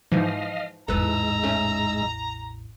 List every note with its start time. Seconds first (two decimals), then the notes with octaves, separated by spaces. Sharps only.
0.12 G#2 E3 F3 D#5 F5
0.88 A1 E2 G#2 G#3 A4 B4 A#5 E6
1.43 A3 C#4